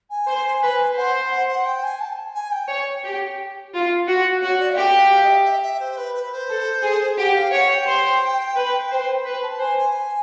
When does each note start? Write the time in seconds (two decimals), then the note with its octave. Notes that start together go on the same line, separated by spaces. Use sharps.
0.10 G#5
0.27 C5
0.62 B4
0.97 C5 F#5
1.31 F#5
1.49 F#5
1.66 G5
1.83 G#5
2.00 A5
2.35 G#5
2.52 G5
2.69 C#5
3.04 G4
3.73 F4
4.08 F#4
4.42 F#4 C#5
4.59 D5
4.70 F5
4.76 G4 E5
4.93 F5
5.11 F5
5.23 D#5
5.28 E5
5.45 E5
5.62 E5
5.80 C5
5.97 B4
6.14 B4
6.32 C5
6.49 A4
6.83 G#4
7.18 G4 F#5
7.35 F5
7.52 C#5 F#5
7.69 G5
7.86 C5
8.56 B4
8.91 C5
9.25 B4
9.42 A5
9.60 C5 G#5
9.77 G#5